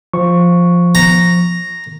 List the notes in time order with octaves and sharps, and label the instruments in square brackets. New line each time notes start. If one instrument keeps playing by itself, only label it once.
[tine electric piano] F3 C#6
[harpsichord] A#5